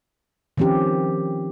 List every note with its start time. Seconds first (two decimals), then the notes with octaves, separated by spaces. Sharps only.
0.58 D#3 F3 C4 C#4 G4